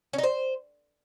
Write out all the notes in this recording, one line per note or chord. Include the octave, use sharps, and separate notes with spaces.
C#4
D#4
C5